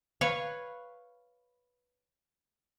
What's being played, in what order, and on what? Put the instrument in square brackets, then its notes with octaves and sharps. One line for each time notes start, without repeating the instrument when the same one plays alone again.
[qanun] B4 C#5 F5